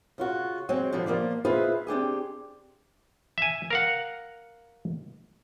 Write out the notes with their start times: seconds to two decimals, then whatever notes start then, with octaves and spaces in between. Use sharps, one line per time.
0.18 C#3 F4 F#4
0.69 F#3 G#3 C4
0.93 D3 F3 G3
1.06 F3 A#3 F4 D5
1.45 E4 F4 G#4 B4 C5 D#5
1.87 C4 D4 G4 G#4
3.38 E5 G#5
3.70 A#4 F5 F#5